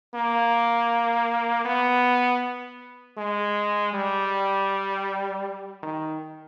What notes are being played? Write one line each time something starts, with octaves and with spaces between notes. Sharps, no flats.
A#3
B3
G#3
G3
D#3